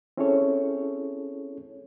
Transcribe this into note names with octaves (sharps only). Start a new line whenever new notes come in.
C4 C#4 E4 G#4 A4 C#5